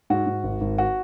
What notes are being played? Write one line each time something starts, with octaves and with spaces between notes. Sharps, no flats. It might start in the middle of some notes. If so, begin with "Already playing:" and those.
G#2 F#4
G#2
G#1
G#1
F#4